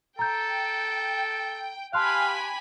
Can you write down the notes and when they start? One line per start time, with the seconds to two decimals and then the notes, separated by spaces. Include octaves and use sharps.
0.19 A4 G5 A#5 G6
1.93 G4 F5 G#5 A5 B5 C6 F#6